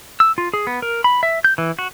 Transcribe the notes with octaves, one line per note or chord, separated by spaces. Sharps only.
E6
F4
G#4
B3
A#4
B5
E5
G6
E3
F#4